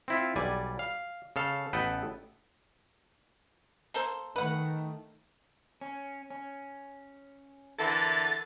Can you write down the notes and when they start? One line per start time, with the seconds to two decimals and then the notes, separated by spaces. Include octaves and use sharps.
0.08 C4 E4 F4
0.36 B1 G3 D5 G#5
0.79 F5
1.36 C#3 A4 F5
1.73 A1 B3 A4 B4 G5
3.94 A#3 A4 C5
4.36 D#3 A3 B4 F#5
5.81 C#4
6.30 C#4
7.79 D3 E3 A4 A#4 A6